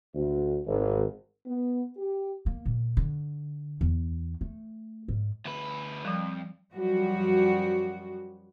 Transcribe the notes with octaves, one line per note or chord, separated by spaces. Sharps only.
D2
G#1
B3
G4
A#3
A#2
D3
E2
A3
G#2
D2 B4
F2 F3 G3
F#2 F3 G3 F#4